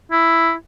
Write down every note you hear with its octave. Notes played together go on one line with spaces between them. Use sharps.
E4